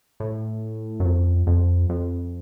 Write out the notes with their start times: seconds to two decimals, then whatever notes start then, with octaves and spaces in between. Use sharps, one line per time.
0.20 A2
1.00 F#2
1.05 F2
1.47 F2
1.89 F2